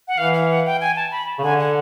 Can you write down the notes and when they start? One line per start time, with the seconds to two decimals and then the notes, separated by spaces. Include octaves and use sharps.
0.08 F#5
0.18 E3 F5
0.33 F5
0.49 F#5
0.66 G5
0.80 G#5
0.96 A5
1.11 B5
1.39 C#3
1.43 D3 G#5
1.59 F#5